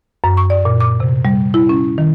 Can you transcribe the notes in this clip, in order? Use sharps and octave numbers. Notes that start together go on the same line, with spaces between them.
F#2
C#6
D5
A#2
D6
C3
G3
E4
C#4
D#3